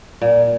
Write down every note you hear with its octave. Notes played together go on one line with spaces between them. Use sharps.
A#2